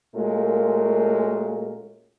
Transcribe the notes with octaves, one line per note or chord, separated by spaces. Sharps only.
A#2 G#3 A3 C#4 F#4 A#4